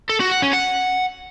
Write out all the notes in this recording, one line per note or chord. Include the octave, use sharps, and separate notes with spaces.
A4
F#4
F#5
C#4
F#5